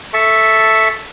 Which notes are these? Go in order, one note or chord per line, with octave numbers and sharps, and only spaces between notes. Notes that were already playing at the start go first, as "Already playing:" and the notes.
A4 E5 A5 C#6